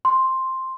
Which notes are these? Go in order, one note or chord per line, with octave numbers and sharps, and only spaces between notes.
C6